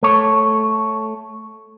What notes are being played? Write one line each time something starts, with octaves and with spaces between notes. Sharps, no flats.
A3 C#5